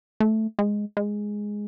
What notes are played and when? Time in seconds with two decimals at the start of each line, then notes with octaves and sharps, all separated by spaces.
0.20 A3
0.59 G#3
0.97 G#3